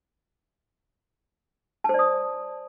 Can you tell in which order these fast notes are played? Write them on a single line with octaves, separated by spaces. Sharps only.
A5 C5 D5 D#6